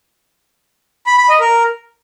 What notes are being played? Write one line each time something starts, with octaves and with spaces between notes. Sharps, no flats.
B5
B5
D#5
A#4